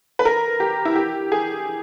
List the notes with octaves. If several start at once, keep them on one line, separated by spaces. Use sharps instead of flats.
B4
A#4
G4
E4
G4
G#4